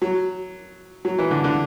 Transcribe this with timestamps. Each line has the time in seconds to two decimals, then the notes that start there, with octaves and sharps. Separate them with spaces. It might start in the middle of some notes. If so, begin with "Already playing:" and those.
0.02 F#3
1.05 F#3
1.19 E3
1.31 D3
1.44 D3